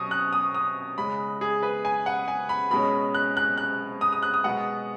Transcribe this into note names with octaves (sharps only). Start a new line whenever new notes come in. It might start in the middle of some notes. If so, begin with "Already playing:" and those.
Already playing: B2 F#3 C#4 C#6 D#6
F#6
D#6
D#6
C#3 G#3 C#4 B5
G#4
B4
G#5
F#5
G#5
B5
B2 G#3 C#4 B5
F#6
F#6
F#6
D#6
D#6
F#6
D#6
B2 G#3 B3 F#5